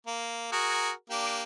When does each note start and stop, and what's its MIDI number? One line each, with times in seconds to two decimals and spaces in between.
0.07 0.52 58
0.52 0.91 66
0.52 0.91 68
0.52 0.91 70
1.10 1.43 58
1.10 1.43 62
1.10 1.43 67